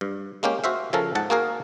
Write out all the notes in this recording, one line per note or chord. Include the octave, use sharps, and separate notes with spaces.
G2
G#3 A#3 C#4 G4
F#4 C5 E5 F5
C#3 F3 C#4 A4 A#4
G#2 F#5 A5
A#3 F#4 G#4 A#4 F5